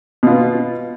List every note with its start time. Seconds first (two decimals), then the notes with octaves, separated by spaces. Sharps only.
0.23 B2
0.27 F4
0.31 B3